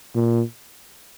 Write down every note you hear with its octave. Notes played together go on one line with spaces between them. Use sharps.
A#2